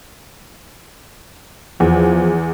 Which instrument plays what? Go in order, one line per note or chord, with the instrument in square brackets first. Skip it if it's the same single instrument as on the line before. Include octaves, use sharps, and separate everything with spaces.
[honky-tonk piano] E2 [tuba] F3